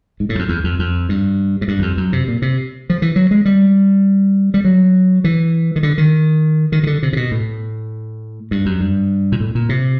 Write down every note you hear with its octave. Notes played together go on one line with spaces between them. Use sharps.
G#2
A2
F#2
F2
E2
F2
F2
G2
G#2
G2
E2
F2
F#2
C3
A#2
C3
F3
E3
F#3
G#3
G3
G3
F#3
E3
D#3
D3
D#3
D#3
D#3
D3
C3
C3
B2
A2
G2
F#2
G2
A#2
A2
A#2
C3